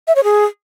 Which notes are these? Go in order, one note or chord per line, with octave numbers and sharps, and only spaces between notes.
E5
C#5
G#4